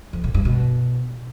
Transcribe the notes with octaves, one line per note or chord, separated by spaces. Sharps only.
F2
A#2
G2
B2